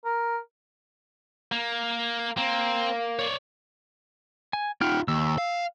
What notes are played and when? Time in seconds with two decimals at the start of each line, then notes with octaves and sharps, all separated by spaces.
0.05 A#4
1.52 A#3
2.37 A#3 C4
3.19 C#5 D5
4.53 G#5
4.81 D#4 F4 F#5 G5 F6
5.08 D#2 E6
5.38 F5